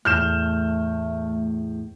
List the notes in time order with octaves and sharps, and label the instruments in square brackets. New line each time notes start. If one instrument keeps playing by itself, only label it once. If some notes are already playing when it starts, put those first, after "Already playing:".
[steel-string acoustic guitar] E2 A2 A5 [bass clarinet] A3 [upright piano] F6 G6 E7